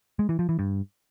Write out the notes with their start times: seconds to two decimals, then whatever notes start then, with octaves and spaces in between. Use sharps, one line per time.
0.19 G#3
0.29 E3
0.39 F3
0.49 E3
0.59 G2